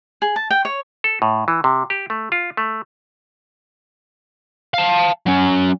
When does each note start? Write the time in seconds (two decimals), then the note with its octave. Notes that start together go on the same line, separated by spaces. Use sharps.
0.22 G#4
0.36 A5
0.51 G5
0.65 C#5
1.04 A4
1.22 A2
1.48 E3
1.64 C3
1.90 G4
2.10 A3
2.32 F4
2.57 A3
4.74 F5 A5
5.26 F#3 C#4